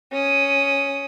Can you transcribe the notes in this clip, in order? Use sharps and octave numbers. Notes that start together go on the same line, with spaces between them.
C#4 D#6